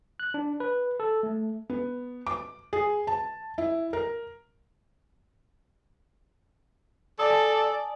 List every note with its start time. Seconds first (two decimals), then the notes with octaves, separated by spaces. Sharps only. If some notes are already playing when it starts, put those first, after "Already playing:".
0.20 F#6
0.34 D4
0.60 B4
1.00 A4
1.23 A3
1.70 B3
2.27 D6
2.73 G#4
3.07 A5
3.58 E4
3.93 A#4
7.19 A4 D5 G#5 A5 D#6